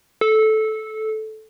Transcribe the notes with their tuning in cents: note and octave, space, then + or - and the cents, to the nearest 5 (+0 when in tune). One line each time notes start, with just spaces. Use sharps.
A4 -15